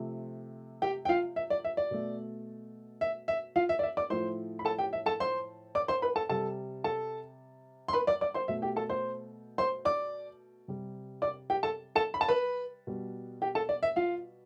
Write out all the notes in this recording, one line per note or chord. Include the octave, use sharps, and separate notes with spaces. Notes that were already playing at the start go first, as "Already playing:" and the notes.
Already playing: C3 F3 A3
G4 G5
G5
F4 F5
E5
D5
E5
D5
B2 A3
E5
E5
F4 F5
E5
D5
E5
D5 D6
A2 F3 A3 C5 C6
B5
A4 A5
G4 G5
E5
A4 A5
C5 C6
D5 D6
C5 C6
B4 B5
A4 A5
C3 G3 A4 A5
A4 A5
C6
B4 B5
D5 D6
D5 D6
C5 C6
B2 A3 E5
G4 G5
A4 A5
C5 C6
C5 C6
D5 D6
C3 G3
D5 D6
G4 G5
A4 A5
A4 A5
B5
A5
B4 B5
B2 G3
G4 G5
A4 A5
D5
E5
F4 F5